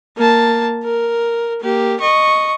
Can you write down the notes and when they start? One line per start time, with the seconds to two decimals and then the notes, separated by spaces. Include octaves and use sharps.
0.17 A#3 A5
0.84 A#4
1.61 A#3 G4
2.00 D#5 C#6